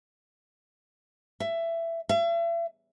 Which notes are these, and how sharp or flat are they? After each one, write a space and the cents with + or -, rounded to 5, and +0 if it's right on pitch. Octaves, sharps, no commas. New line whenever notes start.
E5 +15
E5 +40